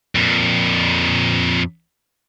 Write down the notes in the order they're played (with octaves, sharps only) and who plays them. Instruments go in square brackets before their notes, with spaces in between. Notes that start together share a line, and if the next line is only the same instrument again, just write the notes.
[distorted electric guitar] F2 A#2